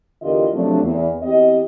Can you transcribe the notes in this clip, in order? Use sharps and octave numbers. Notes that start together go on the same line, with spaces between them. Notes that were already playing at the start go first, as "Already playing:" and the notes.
E2 D3 F4 G4 A#4 D#5
C3 F3 F#3 A3 D4
E2
E2 C4 G4 D#5